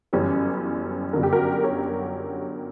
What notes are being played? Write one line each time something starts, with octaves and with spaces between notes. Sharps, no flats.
G1 F#2 E3 G3 C#4
G1 F#2 D3 A#4
G4
F#4 A#4
A#4 C#5